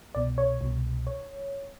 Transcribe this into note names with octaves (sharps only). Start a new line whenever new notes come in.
C2 B2 D5
C#5
C2 B2
C#5